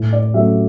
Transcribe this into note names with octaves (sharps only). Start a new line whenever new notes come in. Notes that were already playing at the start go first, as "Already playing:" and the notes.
Already playing: A2
D5
F#3 A3 C#4 E5